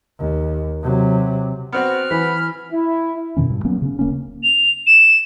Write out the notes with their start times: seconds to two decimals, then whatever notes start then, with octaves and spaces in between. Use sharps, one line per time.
0.19 D#2
0.82 C3 F#3
1.72 B3 C4 F#4 F6
2.11 E3 B5
2.72 E4
3.37 F#2 B2 D#3 C#4
3.50 G2
3.65 F#3 A#3 B3 C#4
3.82 C#3 C#4
3.99 D1 A#3 C#4
4.43 F7
4.87 E7